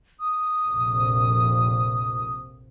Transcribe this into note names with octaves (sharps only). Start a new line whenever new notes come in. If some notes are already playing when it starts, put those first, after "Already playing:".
D#6
A#1 F2 C3